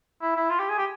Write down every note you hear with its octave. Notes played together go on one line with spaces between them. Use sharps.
E4
E4
F4
G4
G#4
G4